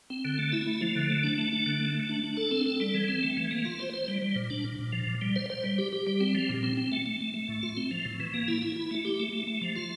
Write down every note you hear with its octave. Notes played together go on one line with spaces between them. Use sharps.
C4
D3
A3
E4
A3
F3
D3
A3
D4
A3
D4
D3
A3
A3
D4
D4
A4
C4
A4
G3
E3
C4
A3
E3
A#3
F4
C5
C5
G3
G3
A#2
D4
A#2
A#2
F3
A#2
G3
C5
C5
G3
G4
G4
G3
C4
F3
A#2
C4
C4
A3
A3
A3
A3
A2
F4
C4
F3
A2
E3
A#3
E4
E4
E4
A3
G4
A3
A3
A3
F3
F4